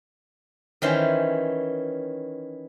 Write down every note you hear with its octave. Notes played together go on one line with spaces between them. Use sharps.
D#3 E3 C#4 C5 B5